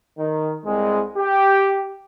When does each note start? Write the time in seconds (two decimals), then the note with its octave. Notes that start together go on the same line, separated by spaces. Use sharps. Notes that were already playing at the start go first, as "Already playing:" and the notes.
0.18 D#3
0.65 C2 G#3
1.17 G4